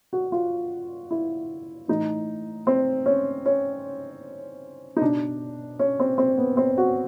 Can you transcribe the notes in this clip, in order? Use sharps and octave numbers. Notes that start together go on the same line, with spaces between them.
F#4
F4
E4
A2 E3 D#4
C4
C#4
C#4
D#4
B2 D4
C#4
C4
C4
B3
C4
F#4